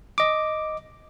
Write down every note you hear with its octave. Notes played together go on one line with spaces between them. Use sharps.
D#5 D6